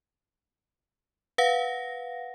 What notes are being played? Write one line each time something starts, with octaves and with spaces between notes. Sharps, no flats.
B4 F5 F#5 A#6